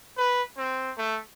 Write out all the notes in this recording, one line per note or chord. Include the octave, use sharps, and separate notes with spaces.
B4
C4
A3